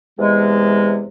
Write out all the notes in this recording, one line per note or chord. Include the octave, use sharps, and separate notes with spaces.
E2 C3 G#3